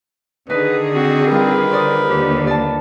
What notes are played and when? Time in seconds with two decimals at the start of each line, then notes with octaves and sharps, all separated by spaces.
0.50 D3 D#3 D#4 G#4 B4
0.93 C4 F#4
1.31 G3 F4 A#4 B4
1.71 C5 D5 D#6
2.09 D#2 D3 G4
2.47 D5 A5